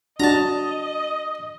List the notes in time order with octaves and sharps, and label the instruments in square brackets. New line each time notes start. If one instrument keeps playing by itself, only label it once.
[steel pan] D4 F#4 [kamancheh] D#5 [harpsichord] A5 A#5